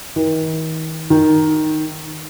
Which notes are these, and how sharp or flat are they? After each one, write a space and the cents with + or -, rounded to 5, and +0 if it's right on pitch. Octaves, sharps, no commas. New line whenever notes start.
D#3 +40
D#3 +0